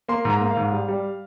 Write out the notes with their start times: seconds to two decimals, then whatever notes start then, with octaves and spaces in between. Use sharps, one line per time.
0.08 A#3 C6
0.25 G#2
0.30 A#5
0.41 A#3
0.51 F5
0.57 G#2
0.72 G3
0.88 G3